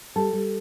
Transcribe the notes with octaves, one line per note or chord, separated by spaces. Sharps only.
G3 A4
G3